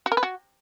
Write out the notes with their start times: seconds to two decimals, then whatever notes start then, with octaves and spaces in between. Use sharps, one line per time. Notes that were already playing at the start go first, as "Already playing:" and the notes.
0.06 F#4
0.12 A#4
0.17 B4
0.23 F#4